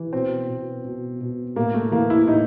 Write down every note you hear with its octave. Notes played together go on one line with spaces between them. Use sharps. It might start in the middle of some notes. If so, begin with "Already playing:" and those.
Already playing: E3
B2 C4
B2
B2
B2
A2 A#3
A3
E3 A#3
E4
A2 D#4